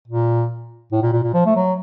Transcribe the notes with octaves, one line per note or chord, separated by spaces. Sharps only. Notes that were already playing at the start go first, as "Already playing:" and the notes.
A#2
A2
A#2
A#2
A#2
F3
A3
F#3